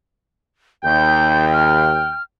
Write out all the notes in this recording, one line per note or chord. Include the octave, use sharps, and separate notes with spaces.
D#2 G5 G6
F6